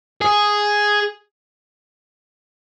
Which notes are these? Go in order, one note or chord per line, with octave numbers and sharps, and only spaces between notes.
G#4